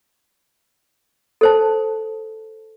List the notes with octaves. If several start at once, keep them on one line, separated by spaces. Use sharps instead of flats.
A4 C5 A5